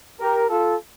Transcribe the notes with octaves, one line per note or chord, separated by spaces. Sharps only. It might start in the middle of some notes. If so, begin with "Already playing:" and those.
G4 A#4
F4 A4